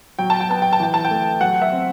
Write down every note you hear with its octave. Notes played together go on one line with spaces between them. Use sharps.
F#3 G5
A5
G5
B3 A5
G5
A5
E3 G5
A5
G5
A3
F#3 F#5
E5
C4